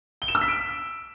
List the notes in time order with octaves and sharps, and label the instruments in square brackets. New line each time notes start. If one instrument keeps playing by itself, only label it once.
[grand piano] G7
E7
E6
B6
D7